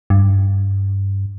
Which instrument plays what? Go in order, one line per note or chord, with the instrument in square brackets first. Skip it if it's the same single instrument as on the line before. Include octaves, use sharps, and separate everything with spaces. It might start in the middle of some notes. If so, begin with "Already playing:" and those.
[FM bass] G2